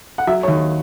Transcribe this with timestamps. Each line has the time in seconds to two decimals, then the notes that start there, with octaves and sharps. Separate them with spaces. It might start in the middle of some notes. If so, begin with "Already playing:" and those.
0.18 F#5
0.27 F#3 E5
0.43 C#5
0.48 D#2